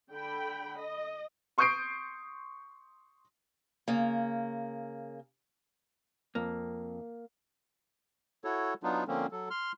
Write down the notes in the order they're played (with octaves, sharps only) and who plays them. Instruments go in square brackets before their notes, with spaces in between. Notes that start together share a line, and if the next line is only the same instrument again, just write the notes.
[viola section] D3 G5 B5
D#5
[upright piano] C6 C#6 D#6 G6 C7 D7
[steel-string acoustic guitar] C#3 A#3
[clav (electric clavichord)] F2 [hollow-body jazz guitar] A#3
[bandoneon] E4 F#4 A4 C#5
F#3 B3 D4 D#4 F4
D3 F3 A#3 C4 C#4
F#3 A4
C6 F6